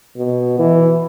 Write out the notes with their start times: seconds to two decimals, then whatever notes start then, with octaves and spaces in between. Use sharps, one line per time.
0.17 B2
0.59 E3